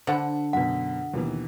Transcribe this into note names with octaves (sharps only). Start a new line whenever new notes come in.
D3 C5 F#5 B5
F#2 B2 F#5
D#2 B2 E3